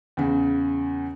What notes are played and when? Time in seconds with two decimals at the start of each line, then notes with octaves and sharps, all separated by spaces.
0.17 E2 C#3